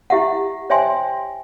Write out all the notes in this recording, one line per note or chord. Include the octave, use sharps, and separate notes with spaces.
E4 G4 E5 F#5
C5 C#5 E5 G5 G#5 C6